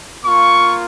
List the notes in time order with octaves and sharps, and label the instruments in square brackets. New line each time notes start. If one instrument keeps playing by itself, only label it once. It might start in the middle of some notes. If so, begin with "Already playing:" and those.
[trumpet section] A#3 F4 C#6